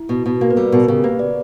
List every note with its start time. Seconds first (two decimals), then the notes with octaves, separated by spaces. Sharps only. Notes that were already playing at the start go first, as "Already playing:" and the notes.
Already playing: E4
0.09 B2
0.26 B2
0.41 A#3 F#4
0.50 B4
0.57 G3 A#4
0.72 B2 A#4
0.88 C#3 G4
1.04 A#3 B4
1.19 D5